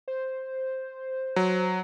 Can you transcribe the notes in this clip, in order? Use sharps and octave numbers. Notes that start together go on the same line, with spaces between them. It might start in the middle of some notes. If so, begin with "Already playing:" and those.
C5
F#3